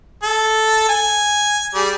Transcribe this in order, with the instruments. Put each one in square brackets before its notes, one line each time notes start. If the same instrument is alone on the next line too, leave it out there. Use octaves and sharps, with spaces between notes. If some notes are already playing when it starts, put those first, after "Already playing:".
[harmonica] A4
G#5
G3 G#4